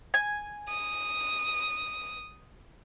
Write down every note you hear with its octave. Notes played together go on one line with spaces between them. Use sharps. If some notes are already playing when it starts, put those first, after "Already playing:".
G#5
D#6